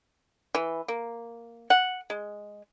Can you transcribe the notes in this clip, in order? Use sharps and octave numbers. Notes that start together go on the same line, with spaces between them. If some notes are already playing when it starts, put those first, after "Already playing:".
E3
A#3
F#5
G#3